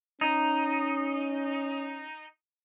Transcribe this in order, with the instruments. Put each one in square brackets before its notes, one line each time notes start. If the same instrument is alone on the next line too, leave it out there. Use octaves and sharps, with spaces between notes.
[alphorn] C#4 [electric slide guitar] D#4